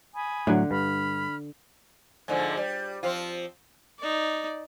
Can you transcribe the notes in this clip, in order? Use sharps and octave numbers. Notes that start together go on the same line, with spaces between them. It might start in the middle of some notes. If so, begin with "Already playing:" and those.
G#5 B5 D#6
A2 D3 F#3
G2 B5 F6
G#2 D3 F3
G3
F3 C4 F4
D#4 D5